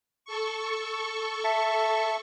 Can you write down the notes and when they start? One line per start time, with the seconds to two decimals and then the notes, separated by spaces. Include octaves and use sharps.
0.25 A4 C#6
1.44 E5 A5